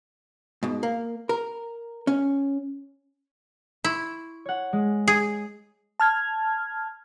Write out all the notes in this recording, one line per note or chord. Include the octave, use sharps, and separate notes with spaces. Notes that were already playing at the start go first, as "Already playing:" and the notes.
G#2 B2
A#3
A#4
C#4
E4 C6 C#6
C#5 F#5
G#3
G#4
A5 F6 G#6